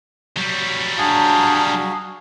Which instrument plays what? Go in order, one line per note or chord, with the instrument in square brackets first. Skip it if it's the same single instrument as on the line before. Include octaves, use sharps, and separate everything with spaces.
[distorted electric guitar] F#3 G3
[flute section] D4 A5 A#5 [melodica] F#4 G#4 F5